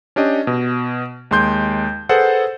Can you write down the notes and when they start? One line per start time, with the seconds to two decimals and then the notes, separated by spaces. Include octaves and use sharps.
0.16 C#4 D4 G4 D#5
0.47 B2
1.31 D#2 G#3 C6 G6
2.09 G#4 A4 B4 C5 F#5